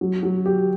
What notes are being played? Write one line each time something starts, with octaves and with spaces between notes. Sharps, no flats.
F#3
F#3
G4